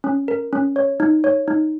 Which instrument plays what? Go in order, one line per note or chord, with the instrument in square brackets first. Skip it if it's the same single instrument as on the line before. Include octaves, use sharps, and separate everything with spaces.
[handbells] C#4
A#4
C#4
C#5
D#4
C#5
D#4